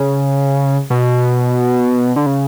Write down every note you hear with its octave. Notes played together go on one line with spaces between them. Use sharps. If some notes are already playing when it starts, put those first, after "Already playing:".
Already playing: C#3
B2
D3
C#3